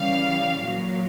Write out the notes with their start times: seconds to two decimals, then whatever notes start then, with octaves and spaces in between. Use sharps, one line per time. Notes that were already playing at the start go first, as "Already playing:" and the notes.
Already playing: C#3 E3 G3 F5
0.61 A#2 F#3